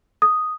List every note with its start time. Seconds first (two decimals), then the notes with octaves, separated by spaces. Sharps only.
0.22 D#6